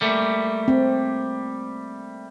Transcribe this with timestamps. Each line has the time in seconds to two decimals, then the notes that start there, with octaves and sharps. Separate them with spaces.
0.01 G3 A3 A#3
0.68 C4